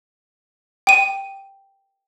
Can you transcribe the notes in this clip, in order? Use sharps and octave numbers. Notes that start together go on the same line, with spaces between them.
G5 D#7